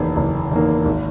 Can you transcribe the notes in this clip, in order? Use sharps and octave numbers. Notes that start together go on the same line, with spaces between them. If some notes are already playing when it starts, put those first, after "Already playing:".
Already playing: F#1 E2 D#3 A#3
F#1
E2 D#3 A#3
G#1